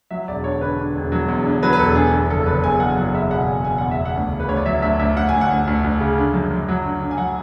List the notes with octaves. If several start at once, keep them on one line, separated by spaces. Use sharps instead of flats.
F#3 E5
E1 D5
D3 C#5
D3 B4
D3
E1
F#3
E2
D3
F#3 B4
B4
E1 A4
D3 G#4
E2
F#1 A4
F#1 B4
E2 G#5
F#1 F#5
F#3 F#5
E2 E5
B2 F#5
E2 G#5
B2 G#5
E2 F#5
E5
E2
F#5
D2
C#3
B4
D2 C#5
D5
F#3 E5
D2 E5
D2 E5
D2 F#5
D2 G#5
F#5
D2
D2
D2
C#3
D3
F#2
F#2
F#3
D3
D3
G#5
F#3 F#5